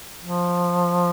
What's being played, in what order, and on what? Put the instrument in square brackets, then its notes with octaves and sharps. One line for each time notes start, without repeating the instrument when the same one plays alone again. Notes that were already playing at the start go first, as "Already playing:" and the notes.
[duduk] F3